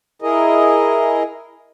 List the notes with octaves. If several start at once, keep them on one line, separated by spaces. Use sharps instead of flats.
E4 G#4 A#4 D#5